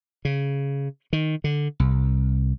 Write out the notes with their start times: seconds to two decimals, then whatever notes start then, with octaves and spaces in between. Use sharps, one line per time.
0.25 C#3
1.13 D#3
1.44 D3
1.80 C2